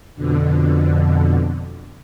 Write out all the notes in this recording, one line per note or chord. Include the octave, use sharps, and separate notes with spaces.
F2 B2 D3